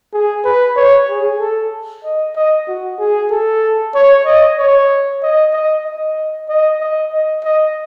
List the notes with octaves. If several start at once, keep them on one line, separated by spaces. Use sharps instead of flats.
G#4
B4
C#5
G#4
A4
D#5
D#5
F#4
G#4
A4
C#5
D#5
C#5
D#5
D#5
D#5
D#5
D#5
D#5
D#5